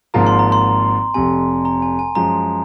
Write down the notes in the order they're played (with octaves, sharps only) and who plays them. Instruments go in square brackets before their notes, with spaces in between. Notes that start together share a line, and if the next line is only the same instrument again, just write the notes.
[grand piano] G#1 G#2 F3 A#3 F4 [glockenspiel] A#5
[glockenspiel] C6
A#5
C6
[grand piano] F1 F2 C3 [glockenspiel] G#5
[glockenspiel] A#5
G#5
G#5
[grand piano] F#2 F3 G#3 [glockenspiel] A#5